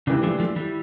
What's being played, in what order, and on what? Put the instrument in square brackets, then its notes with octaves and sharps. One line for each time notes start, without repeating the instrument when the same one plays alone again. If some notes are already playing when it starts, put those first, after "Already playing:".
[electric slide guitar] C#3 [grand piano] E3 G3 D4
[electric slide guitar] F3 A3
F3 A3
E3 G3